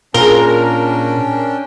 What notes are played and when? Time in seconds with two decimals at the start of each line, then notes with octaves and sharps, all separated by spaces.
0.14 A#2 C#4 D4 F4 G#4 A#4 G5 G7